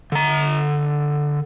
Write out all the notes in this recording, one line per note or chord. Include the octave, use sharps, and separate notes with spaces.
D3 A#5